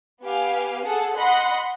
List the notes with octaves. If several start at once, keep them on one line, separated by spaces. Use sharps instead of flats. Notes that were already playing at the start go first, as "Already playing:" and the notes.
B3 G4 F5 G#5
G#4 A4 F#5 A5
D#5 F#5 B5 C6 F#6 B6